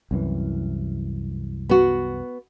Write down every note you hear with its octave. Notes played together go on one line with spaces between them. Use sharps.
C2 F#2 E3
B3 F#4